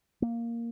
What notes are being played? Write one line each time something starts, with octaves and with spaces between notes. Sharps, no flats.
A#3